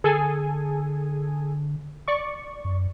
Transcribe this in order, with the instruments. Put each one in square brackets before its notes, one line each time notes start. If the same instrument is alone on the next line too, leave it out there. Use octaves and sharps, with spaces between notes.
[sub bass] D3 [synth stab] G#4 A4 G#5
[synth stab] D5 C#6
[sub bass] F#2